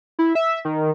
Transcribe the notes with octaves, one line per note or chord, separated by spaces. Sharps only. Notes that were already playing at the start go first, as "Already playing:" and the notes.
E4
E5
D#3